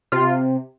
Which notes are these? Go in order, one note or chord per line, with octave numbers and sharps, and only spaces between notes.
C3 F4